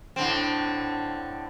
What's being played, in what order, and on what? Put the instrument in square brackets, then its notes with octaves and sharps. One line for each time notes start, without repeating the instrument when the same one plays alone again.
[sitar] A2 D3 C4